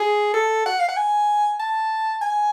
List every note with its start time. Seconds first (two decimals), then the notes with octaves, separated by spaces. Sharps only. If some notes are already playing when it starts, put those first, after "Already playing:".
Already playing: G#4
0.34 A4
0.66 F#5
0.79 F5
0.89 F#5
0.97 G#5
1.59 A5
2.22 G#5